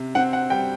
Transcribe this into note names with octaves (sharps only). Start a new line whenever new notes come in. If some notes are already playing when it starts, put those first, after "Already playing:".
Already playing: C3
C4 F#5
F#5
G3 G5